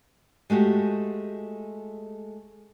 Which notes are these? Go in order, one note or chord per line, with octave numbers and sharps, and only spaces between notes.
G#3 A3 F#4 G4